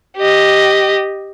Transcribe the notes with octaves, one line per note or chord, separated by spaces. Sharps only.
G4 D#5